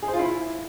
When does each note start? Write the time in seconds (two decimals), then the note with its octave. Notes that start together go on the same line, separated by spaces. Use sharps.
0.02 G#4
0.08 C5
0.14 F4
0.19 E4